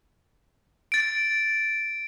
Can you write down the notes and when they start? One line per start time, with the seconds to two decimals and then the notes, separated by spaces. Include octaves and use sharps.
0.92 A6 D7